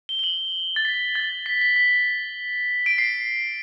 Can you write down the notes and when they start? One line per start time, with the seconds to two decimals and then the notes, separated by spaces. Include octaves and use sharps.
0.09 G7
0.19 G7
0.24 F#7
0.76 A6
0.85 B6
1.15 A6
1.46 B6
1.61 B6
1.76 B6
2.86 D7
2.98 C7